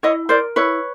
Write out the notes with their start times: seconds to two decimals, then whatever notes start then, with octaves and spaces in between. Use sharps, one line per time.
0.03 E4 C#5 D#5
0.29 A#4 C5 D5
0.56 E4 B4 C#5